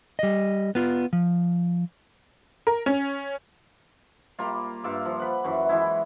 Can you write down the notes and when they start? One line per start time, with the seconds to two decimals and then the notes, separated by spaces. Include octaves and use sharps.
0.19 G3 D#5
0.75 B3 F4
1.13 F3
2.67 A#4
2.86 C#4
4.39 G3 A#3 F4
4.84 G2 F4 E5 D6
5.05 F3
5.19 B4 F#5
5.44 F#2 E3 C#6
5.69 E3 G#3 E4